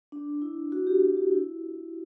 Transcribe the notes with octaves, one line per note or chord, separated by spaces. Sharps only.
D4
E4
F#4
G4
F#4
F#4
E4